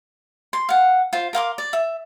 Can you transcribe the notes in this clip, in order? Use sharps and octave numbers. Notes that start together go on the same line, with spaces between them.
C6
F5 F#5
F4 C5
A#4 F5 C6 D6
D5
E5